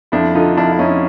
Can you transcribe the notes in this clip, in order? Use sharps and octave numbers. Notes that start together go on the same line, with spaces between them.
F2 D4 E4
D3 D#4 F4
F2 D4 E4
E4
F2 C#4 D#4